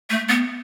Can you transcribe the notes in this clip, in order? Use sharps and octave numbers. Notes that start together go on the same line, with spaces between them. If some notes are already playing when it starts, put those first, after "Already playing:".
A3
B3